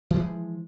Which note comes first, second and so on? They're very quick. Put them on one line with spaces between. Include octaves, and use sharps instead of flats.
E3 F3 G#3